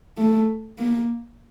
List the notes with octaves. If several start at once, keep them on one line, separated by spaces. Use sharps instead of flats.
A3
A#3